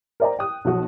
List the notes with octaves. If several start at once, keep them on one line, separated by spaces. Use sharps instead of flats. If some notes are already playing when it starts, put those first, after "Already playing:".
A#4 C5 D5 D#5 G5 A#5
G5 D#6 F#6
B1 F3 F#4 D#6